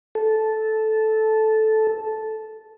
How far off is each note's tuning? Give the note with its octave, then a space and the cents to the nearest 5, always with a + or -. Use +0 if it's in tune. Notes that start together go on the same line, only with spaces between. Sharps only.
A4 -10